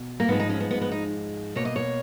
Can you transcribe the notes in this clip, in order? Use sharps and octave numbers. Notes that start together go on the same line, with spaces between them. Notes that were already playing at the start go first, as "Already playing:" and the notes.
Already playing: B2
A#3
G#2 F3 G#3 B3
D#4
C#4
B3
B3
B3
D#4
B2 A#3 C#5
D#5
C#5